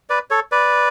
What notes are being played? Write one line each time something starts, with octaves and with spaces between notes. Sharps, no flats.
B4 D5
A4 C#5
B4 D5